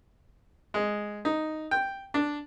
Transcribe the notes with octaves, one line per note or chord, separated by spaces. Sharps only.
G#3
D#4
G5
D4